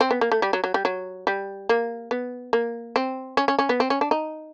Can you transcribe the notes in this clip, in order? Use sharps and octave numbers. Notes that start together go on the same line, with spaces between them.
C4
B3
A#3
A3
G3
F#3
F#3
G3
F#3
G3
A#3
B3
A#3
C4
C#4
C#4
C#4
B3
C4
C#4
D4
D#4